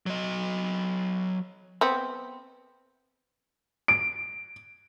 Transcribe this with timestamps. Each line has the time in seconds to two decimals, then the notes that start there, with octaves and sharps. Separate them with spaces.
0.06 F#3 D#5
1.81 B3 C4
3.88 D7